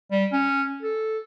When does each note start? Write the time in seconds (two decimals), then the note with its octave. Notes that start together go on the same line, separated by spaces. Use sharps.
0.11 G3
0.32 C#4
0.82 A4